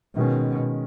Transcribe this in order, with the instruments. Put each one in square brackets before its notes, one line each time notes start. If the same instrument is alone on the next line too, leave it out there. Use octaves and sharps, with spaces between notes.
[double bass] B2 [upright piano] D#3 G#3 C#4